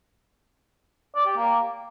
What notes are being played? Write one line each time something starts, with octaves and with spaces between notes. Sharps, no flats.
D5
G4
A#3